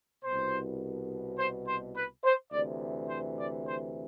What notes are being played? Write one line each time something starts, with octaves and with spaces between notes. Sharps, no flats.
C2 B2 C5
C5
C5
B4
C5
D2 C3 E3 D5
C5
D5
C5